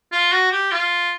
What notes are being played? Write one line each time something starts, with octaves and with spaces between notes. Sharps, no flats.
F4
F#4
G4
F4